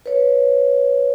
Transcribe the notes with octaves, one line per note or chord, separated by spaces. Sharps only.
B4 C#5